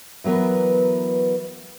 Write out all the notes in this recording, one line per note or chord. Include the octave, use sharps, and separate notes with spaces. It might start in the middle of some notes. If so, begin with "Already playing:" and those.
E3 F#3 B3 A#4 B4